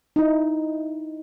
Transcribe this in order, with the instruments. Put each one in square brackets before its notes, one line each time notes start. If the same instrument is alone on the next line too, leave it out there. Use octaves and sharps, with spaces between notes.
[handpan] D#4 E4